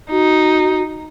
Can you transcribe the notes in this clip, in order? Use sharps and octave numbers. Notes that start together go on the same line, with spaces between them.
D#4 F#4